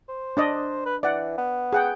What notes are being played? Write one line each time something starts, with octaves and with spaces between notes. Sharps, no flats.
C5
D4 D5 D#5
B4
E3 D5 F#5
B3
G#4 F#5 G5